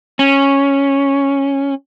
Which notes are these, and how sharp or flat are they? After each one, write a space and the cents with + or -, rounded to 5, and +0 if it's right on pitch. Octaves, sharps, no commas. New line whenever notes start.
C#4 -5